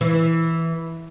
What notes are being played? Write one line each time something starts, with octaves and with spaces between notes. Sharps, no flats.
E3